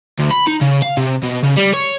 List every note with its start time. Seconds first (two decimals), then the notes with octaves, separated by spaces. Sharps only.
0.19 D2
0.31 B5
0.48 D#4
0.62 C#3
0.82 F5
0.97 C3
1.23 B2
1.43 C#3
1.57 G3
1.73 C#5